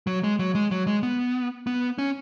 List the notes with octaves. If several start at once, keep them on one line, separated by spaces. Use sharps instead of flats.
F#3
G#3
F#3
G#3
F#3
G#3
B3
B3
C#4